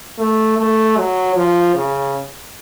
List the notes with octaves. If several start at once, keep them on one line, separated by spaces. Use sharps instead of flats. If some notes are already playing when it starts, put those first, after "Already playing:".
A3
A3
F#3
F3
C#3